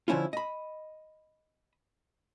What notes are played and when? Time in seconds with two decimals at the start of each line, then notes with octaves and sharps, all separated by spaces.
0.08 D3 F3 C#4 E4 F4
0.33 D#5 B5